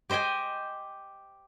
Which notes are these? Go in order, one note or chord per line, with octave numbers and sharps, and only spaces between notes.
G4 C5 D#5 G5 G#5